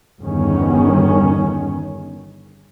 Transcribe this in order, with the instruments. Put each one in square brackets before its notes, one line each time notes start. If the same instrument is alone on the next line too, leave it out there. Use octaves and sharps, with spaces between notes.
[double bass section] G1 E2 D#3 C#4